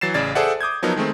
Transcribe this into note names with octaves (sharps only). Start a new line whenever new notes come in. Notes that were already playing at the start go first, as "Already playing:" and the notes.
E3 F#3 A6 C7 E7
A1 C#3 D5 G#6 A6
G#4 A4 C5 D5 E5 F#5
D6 D#6 G6 G#6
F3 F#3 B3 D#4 A#4
D#3 G#3 A3 C4